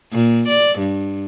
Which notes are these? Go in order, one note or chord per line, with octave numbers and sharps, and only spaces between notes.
A#2
D5
G2